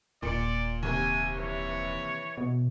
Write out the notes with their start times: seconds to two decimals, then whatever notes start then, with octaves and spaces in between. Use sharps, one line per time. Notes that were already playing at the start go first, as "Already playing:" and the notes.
0.22 D#1 A#2 D5 C#7
0.83 D#2 C3 G#5
1.37 E3 C#5
2.37 B2